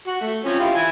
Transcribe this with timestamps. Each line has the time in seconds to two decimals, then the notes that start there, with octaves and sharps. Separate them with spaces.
0.08 F#4
0.21 A3
0.45 F3 C4 C#4
0.60 E4 F4 G4
0.75 E4 G#5